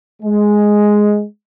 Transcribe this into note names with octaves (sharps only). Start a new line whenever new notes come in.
G#3